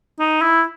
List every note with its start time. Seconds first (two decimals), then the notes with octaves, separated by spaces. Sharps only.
0.20 D#4
0.41 E4